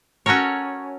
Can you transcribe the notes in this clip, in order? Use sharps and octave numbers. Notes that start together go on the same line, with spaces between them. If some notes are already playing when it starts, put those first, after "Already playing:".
C#4 F#4 A4 A#4 C#5